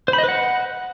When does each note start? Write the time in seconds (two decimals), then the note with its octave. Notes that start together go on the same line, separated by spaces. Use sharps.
0.08 C5
0.13 B5
0.18 D#5
0.23 B4
0.29 F#5